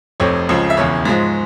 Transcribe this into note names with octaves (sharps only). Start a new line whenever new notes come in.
F1 F2 C3 C#5
C#2 C#3 F3
E5
E1 E2 C#3 C#5
G#2 F3 G#3